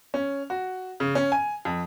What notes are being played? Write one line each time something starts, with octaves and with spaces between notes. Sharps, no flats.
C#4
F#4
C#3
C#4
G#5
F2